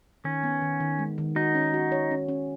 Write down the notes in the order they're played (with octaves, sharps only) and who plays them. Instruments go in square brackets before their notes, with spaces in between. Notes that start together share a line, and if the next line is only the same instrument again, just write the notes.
[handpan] D#3 [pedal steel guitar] C#4
[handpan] B3
D#3
D#3
G#3
D#3
[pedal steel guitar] D#4 [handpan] F#4
[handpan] C#4
F#4
C#5
C#4
C#4